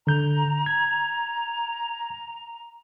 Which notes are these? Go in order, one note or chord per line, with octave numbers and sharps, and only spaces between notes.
D3 A#5 G6
G#6